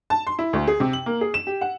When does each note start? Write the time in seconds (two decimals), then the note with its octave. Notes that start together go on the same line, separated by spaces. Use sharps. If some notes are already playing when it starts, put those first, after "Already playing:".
0.10 A5
0.27 C6
0.39 E4
0.53 D2
0.67 G#4
0.80 C3
0.93 F#7
1.06 A#3
1.21 G#4
1.34 E7
1.47 G4
1.61 F#5